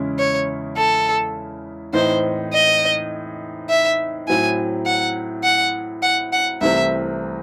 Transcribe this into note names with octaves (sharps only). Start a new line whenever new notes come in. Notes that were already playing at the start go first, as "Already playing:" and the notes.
Already playing: E2 C#3 G#3 C#4 E4
C#5
A4
A2 E3 C4 D#4 C5
D#5
E5
A2 F#3 C4 E4 G#5
F#5
F#5
F#5
F#5
C2 C3 E3 A3 C4 E5